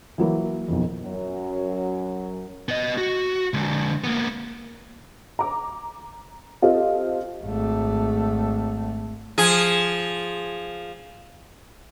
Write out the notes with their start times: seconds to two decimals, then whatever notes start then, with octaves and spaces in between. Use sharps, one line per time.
0.18 E3 F#3 A#3 E4
0.68 B1 F2
1.03 F#2 F#3
2.69 B3 D#5
2.98 F#4
3.54 D3 G#3
4.04 A#3 B3
5.39 A#5 D6
6.62 C4 F4 G4 A4 D#5
7.43 G#1 A3
9.38 F3 G#4